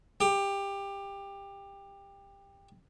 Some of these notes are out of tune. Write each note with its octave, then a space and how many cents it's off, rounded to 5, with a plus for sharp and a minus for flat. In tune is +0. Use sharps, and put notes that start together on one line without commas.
G4 +20